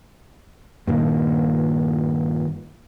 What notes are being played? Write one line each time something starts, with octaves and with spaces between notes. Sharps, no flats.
G2 A#2 D#3